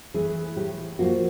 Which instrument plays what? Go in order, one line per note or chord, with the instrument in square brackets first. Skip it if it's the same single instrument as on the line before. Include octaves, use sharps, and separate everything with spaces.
[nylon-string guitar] E3 A3 G#4
A2 G4
F3 A#3 F#4